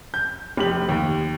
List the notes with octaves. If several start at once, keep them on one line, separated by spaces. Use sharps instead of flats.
G6
F1 G4 F#7
D#2